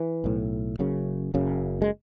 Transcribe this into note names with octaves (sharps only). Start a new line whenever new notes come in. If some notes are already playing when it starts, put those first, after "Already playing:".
Already playing: E3
B1 A2
F#1 F#2 C#3
F#1 F#2 C#3
G#3